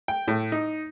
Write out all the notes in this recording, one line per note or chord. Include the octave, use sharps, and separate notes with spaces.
G5
A2
D#4